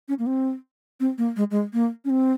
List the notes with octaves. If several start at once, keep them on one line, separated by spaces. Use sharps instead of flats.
C#4
A#3
C4
C4
A#3
G#3
G#3
A#3
C#4
C4